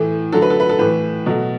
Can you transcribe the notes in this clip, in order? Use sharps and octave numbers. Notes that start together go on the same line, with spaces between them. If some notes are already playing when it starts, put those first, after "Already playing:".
Already playing: A2 E3 A3
D3 F#3 A3 A4
B4
A4
B4
A4
A2 E3 A3 B4
B2 F#3 A3